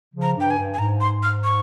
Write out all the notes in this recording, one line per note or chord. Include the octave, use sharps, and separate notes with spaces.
C#3 F3
A#5
G2 G5
G#5
G2
G#5
G#2 A#5
C6
F6
C#6